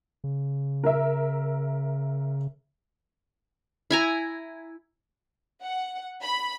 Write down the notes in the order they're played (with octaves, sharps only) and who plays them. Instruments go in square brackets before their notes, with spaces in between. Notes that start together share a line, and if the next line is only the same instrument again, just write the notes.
[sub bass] C#3
[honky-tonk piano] A#4 E5
[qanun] E4 G#5 A#5
[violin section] F#5
B5